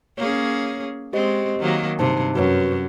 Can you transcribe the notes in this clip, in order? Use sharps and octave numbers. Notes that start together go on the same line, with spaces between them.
A#3 C#4 G#4 C#5
G#3 C4 G4 C5 D#5
D#3 F#3 A#3
G2 C3 D#4 C5 A5
F#2 F#4 B4 C#5